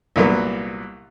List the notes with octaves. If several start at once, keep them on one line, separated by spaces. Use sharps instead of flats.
C2 A#2 F#3 A#3 B3